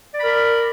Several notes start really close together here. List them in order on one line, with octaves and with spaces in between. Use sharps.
D5 B5 A#4